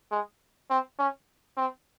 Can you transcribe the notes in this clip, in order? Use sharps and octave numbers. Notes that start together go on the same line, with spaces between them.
G#3
C4
C#4
C4